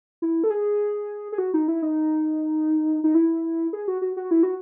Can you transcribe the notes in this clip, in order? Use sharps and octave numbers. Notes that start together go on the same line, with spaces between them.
E4
A4
G#4
G#4
F#4
D#4
E4
D#4
D#4
E4
G#4
F#4
F#4
F#4
E4
F#4